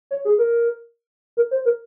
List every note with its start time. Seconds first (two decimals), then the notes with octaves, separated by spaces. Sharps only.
0.11 C#5
0.25 G#4
0.38 A#4
1.37 A#4
1.51 C5
1.65 A#4